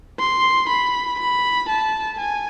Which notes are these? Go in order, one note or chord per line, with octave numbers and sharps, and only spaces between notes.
C6
B5
B5
A5
G#5